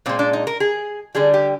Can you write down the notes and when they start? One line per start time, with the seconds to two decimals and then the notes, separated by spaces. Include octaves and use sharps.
0.06 A#2 G#3 C4
0.19 D4
0.33 D#4
0.47 A#4
0.60 G#4
1.15 D3 G3 G#4
1.34 G4